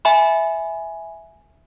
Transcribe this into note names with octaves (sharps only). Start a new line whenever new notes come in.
E5 G#5 B5